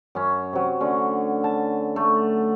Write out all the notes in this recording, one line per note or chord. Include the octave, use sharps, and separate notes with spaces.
F#2 C#4
C3 F#3
D3 A3 C#4
A5
A3